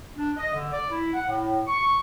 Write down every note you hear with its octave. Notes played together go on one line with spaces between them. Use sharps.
D4
D#5
D3
D5
E4
F#5
A2
C#6